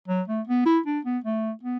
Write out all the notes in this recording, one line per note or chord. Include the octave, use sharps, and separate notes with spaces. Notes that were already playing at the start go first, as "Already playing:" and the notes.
F#3
A3
B3
E4
D4
B3
A3
B3